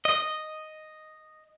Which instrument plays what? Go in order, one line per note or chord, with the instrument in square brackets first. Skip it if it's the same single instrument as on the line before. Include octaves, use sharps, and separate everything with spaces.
[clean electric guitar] D#5